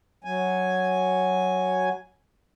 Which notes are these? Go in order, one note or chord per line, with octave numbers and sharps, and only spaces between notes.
F#3 G#5